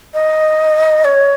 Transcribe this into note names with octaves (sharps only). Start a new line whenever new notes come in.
D#5
C#5